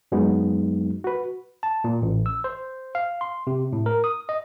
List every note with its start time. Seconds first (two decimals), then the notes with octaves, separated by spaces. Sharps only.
0.12 F#2 F#3 G#3 B3 D#4
1.04 F#4 B4
1.63 A5
1.84 A#2
2.02 A1
2.26 E6
2.44 C5
2.95 F5
3.21 C6
3.47 C3
3.73 A2
3.86 A#4
4.04 D#6
4.29 D#5